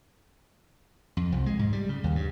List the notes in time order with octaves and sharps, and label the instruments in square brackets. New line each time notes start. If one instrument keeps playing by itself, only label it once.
[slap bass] F2
C2
G#3
G#2
G3
C#3
D#2
G2